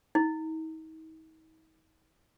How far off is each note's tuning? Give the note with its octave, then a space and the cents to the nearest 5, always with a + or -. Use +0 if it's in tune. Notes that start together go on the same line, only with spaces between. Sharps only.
D#4 +40